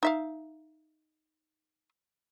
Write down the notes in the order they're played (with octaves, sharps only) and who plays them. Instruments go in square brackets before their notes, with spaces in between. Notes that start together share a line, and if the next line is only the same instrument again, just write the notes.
[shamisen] D#4 E5 F5